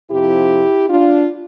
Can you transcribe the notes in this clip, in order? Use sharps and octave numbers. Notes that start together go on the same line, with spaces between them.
F2 C3 F3 E4 G4
D4 F4